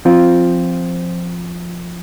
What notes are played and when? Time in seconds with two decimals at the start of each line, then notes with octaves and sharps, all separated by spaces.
0.05 F3 C4 F4